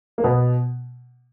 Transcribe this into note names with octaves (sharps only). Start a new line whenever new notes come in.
A#3
B2 B3